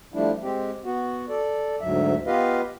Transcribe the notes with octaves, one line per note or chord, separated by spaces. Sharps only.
F3 G3 A3 D4 E4
G#3 C4 G4
B3 F#4
A4 D5
D2 G#2 F#3 E5
B3 F4 G4 B4 D#5 F5